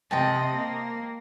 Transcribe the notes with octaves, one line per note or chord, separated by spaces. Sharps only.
C3 C5 D#5 G5 A5
A#3